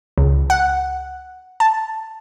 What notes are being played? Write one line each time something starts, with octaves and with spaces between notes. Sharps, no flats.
C#2
F#5
A5